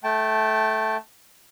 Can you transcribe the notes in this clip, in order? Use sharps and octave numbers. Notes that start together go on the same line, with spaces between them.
A3 G5 A5